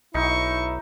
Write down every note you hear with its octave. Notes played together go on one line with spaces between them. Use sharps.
B1 D#4 E4 C#6